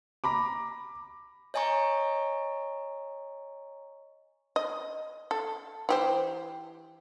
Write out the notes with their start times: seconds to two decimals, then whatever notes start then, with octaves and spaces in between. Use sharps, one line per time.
0.24 A#5 B5 D6
1.54 C#5 D#5 G#5 A#5 C#6
4.56 D#5
5.31 A4
5.89 E3 G4 C5